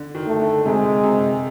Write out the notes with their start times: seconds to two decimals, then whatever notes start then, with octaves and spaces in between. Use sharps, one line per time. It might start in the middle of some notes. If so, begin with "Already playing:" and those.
Already playing: D3
0.15 D#3
0.27 A3
0.39 D3
0.65 C3 G#3
1.03 C3